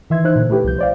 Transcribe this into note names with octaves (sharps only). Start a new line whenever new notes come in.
D#3 E3 E5 C6 G#6
E3 D#4 C5 E5 F#6
A#2 D3
A3 E4 G4 B4
C2 F3 G6
C5 D5 F5